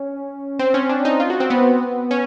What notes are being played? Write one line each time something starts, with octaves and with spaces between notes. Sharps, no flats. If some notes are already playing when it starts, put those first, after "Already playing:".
Already playing: C#4
C4
C#4
D4
D#4
F4
F#4
C4
B3
C#4